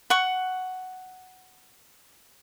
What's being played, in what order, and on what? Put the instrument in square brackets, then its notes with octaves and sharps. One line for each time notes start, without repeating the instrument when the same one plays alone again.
[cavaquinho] F#5 C#6